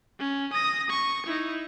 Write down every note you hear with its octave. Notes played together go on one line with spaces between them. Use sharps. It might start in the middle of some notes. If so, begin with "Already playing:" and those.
C#4
D#6 A#6
C#6
D#4 E4